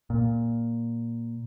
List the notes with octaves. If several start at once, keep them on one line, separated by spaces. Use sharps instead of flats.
A#2